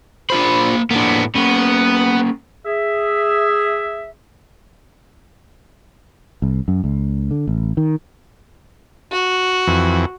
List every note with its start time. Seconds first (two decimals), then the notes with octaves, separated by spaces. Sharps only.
0.30 A#3 D4 F4 C5 B5
0.91 A2 A#3 B3 D4
1.35 A#3 B3 C#4
2.65 G#4 E5
6.42 C2
6.68 F#2
6.84 C#2
7.31 D3
7.47 A1
7.77 D#3
9.12 F#4
9.67 F2 E3